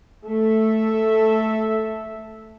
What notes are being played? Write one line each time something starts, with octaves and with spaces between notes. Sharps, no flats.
A3 A4 E5